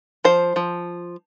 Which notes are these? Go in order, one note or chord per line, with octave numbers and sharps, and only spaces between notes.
F3 C5
F3